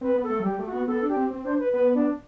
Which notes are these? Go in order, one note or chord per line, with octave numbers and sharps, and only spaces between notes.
C4 B4
B3
A4
A3
F#3
G3 G4
A3
F#4
B3
B3 A4
D4
G4
C4
C4
D4 C5
B4
B3 B4
D4